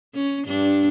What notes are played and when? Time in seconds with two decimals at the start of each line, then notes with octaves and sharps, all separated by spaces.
0.15 C#4
0.47 G2 D4